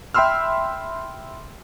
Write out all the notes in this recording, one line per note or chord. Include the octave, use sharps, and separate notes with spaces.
E5 G5 B5 C6 E6 F6